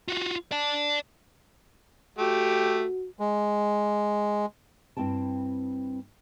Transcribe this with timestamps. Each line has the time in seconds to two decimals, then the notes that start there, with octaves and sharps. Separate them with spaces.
0.08 F4 F#4
0.52 D5 A5
2.18 A3 F#4 G4
3.20 G#3
4.97 G2 C4 E4 G5 A5